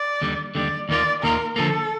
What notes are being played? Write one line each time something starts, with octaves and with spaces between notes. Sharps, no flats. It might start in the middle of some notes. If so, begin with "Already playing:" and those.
Already playing: D5
D#2 D3 G3
D#2 D3 G3 D5
D#2 D#3 A#3 F4 D5
D#2 D#3 A#3 F4 A#4
D3 F3 A#3 A4